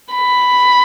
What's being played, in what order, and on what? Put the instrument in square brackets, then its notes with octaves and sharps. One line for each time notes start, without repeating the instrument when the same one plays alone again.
[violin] B5